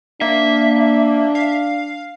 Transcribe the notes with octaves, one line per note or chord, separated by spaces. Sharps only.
A#3 D4 E5
F5